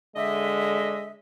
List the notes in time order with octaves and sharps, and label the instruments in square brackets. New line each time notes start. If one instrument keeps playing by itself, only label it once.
[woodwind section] D3 D#5 E5 [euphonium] G#3